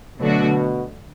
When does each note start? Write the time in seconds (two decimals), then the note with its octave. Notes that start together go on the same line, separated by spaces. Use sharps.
0.20 B2 D3 F#3 A3 D4 F#4